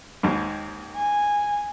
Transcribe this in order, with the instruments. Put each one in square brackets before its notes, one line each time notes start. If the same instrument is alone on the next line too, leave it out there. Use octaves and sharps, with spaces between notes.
[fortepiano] D#2 G#2
[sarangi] G#5